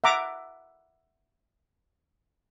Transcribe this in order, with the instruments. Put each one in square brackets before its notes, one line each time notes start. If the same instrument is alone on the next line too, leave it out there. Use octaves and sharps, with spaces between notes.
[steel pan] E5 F#5 A#5 D6